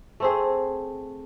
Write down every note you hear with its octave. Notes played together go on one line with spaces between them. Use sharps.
A3 C4 G#4